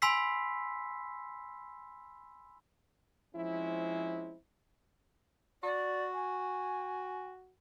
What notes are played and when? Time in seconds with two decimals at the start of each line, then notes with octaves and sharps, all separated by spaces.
0.02 G#5 B5 C6 E6 B6 C7
3.35 F3 G#3 C4 C#4 E4
5.63 F#4 D5
6.14 G#5